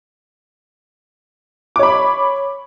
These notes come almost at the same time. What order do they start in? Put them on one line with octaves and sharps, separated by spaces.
D6 C#5 B5